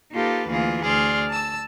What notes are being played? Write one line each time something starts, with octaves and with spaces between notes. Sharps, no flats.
A#3 D#4 F4 G4 A4 B4
D2 E3 A#3 F4 G#4
D2 G#4 D5 C6 F6
A5 E6